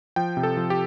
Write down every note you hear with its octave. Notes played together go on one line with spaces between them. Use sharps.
F3 G5
C3
A4
F3
G4